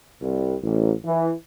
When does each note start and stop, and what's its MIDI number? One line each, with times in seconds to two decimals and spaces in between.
0.22 0.56 36
0.62 0.92 33
1.05 1.32 52